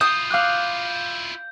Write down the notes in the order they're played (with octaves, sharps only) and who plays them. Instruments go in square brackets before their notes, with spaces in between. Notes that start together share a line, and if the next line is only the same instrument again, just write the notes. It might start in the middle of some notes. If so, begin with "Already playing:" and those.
[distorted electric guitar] E4 F4 [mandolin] D#6 [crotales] G6
[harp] F5 D6 F#6